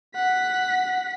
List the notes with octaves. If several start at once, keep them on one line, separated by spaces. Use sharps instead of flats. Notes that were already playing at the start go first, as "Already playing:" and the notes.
F#5 B6